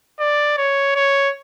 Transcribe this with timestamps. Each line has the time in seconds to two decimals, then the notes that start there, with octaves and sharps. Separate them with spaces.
0.19 D5
0.58 C#5
0.95 C#5